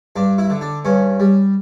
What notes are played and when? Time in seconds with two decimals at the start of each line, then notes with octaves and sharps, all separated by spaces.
0.16 G2 D4
0.38 E4
0.50 D3
0.61 D4
0.85 G2 C#4
1.20 G3